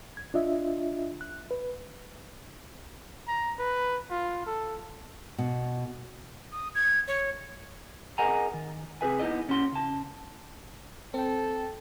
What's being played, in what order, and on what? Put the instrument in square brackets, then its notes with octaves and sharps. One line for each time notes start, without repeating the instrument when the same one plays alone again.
[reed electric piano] G#6
D4 F4 D#5 E5
F#6
B4
[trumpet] A#5
B4
F4
A4
[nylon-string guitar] B2
[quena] D#6
G#6
C#5
[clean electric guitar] G#4 A#4 D#5 F#5 G#5 A#5
D#3
C3 G#4 B4 E5 G#5
B3 D#4 E4 D5 D#5
A#2 C#4 F#4 C6
C#3 A5
[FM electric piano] C4 G5 [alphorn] A4